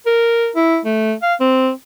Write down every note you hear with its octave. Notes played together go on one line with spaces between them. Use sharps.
A#4
E4
A3
F5
C4